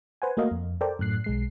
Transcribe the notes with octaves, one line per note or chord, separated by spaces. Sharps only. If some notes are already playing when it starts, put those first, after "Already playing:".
B4 C5 F#5 G#5
A3 A#3 F#4 A#4 D#5 F5
F2
A4 A#4 C5 D5 G5
F#2 A2 F#6 C7
B1 G#3 C7